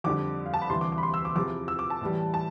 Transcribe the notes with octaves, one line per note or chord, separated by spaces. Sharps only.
F2 D3 G3 D6
F5
A5
B5
D2 C3 E3 G3 C6
D6
D6
B5
C6
E6
D6
E2 C3 F3 D6
E6
D6
A5
A2 E3 G3
A5